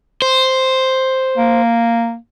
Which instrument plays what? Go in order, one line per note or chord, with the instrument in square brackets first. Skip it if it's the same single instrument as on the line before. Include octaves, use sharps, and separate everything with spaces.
[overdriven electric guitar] C5
[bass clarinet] A#3